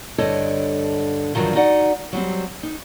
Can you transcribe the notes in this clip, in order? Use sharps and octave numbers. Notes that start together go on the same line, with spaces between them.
G2 D3 A4 C#5 D#5
G2 D3 D#3 F3 F#3
D#4 F#4 D5 F#5
F#3 G3 C4
D#4